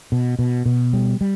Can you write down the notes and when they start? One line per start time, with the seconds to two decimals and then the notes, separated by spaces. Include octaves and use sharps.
0.12 B2
0.39 B2
0.66 B2
0.93 G3
1.21 G3